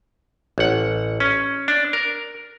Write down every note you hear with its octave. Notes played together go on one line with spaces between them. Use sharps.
A1 F#5
C#4
D4
A#4